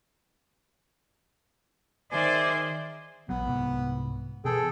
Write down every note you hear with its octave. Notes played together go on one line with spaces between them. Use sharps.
D#3 G#4 C5 D5 E5 G#5
A#1 F#3 B3
C2 G#2
B2 E3 B3 G#4 A4 G5